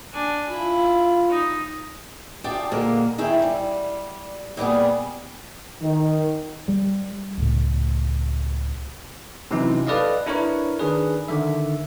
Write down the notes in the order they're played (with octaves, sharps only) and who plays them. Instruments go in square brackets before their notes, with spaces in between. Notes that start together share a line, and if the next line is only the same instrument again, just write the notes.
[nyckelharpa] D4 G#5
[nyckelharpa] E4 [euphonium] F4
[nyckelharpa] D#4
[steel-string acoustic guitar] D4 F4 G4 G#4 G5 A5
A#2 D3 G#3 A#3
D#3 E4 G#4 G5
G3
A#2 G3 B3 G#4
[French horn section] D#3
[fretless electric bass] G3
C#2 A2
[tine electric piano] C3 E3 F#3 C#4 D#4 E4
G4 A4 B4 D5 D#5 F5
D4 E4 A#4 B4 C#5
D#3 D4 G#4 B4
D3 D#3 E5